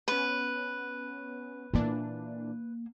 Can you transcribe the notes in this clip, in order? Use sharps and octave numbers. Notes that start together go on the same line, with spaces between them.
B3 C#4 B4
A#2 E3 A#3 D4